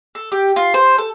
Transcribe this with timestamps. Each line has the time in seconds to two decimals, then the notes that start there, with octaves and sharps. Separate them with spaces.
0.15 A4
0.32 G4
0.56 F4
0.74 C5
0.98 A4